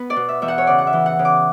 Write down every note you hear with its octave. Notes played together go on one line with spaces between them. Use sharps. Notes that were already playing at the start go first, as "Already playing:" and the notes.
Already playing: B3 B4
D5
B2
E5
E2 E5
F#5
C#5
C#3 D5
F#5
E5
E3
F#5
C#3
D6